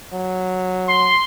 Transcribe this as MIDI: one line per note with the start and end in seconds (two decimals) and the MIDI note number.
0.13 1.13 54
0.88 1.24 84